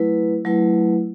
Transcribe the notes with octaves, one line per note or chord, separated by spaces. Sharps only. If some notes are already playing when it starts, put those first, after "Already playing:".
Already playing: F#3 A3 E4 B4
F#3 A3 E4 B4